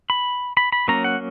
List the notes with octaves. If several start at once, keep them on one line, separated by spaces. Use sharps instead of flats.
B5
B5
B5
F#3 A#3 C#4 A#5
F#5